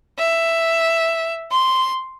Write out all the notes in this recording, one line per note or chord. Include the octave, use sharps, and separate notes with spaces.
E5
C6